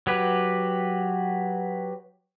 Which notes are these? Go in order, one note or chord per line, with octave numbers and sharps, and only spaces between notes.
F#3 G4 B4